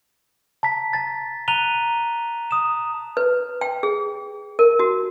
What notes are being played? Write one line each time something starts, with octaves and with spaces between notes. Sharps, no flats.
A5 A#5 B6
A5 A6
A#5 F#6 D#7 F7 G7
D#6 E7
B4
G5
G#4
A#4
F#4